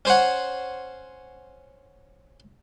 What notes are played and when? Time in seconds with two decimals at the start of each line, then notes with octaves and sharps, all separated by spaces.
0.05 C#4 C5 C#5 F#5